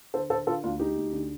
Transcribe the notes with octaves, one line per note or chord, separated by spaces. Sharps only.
D3 A4 C5
D3 A4 C5
D3 F4 A4
D2 D4 F4
D2 D#4 G4
D2
D3